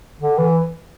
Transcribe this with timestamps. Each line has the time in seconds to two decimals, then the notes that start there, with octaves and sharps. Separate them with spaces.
0.21 D3
0.38 E3